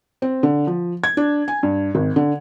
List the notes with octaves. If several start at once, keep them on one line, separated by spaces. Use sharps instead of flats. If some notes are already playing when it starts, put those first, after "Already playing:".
C4
D3
F3
G#6
D4
G#5
G2
G#1
D3